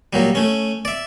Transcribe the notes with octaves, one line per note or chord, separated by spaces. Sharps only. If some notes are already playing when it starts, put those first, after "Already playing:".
A#2 F#3 G3
A3 C#4
D5 E5